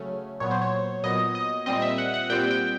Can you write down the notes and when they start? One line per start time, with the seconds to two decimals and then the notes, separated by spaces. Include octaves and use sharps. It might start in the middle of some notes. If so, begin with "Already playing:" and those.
Already playing: C#3 F#3 A3 C#4
0.40 A#2 F#3 B3 C#5
0.51 C5
0.62 C#5
1.03 A#2 F#3 B3 D#5
1.35 D#5
1.66 A#2 G3 C4 D#5
1.82 E5
1.98 F#5
2.14 F#5
2.29 A#2 G3 C4 G5
2.51 G5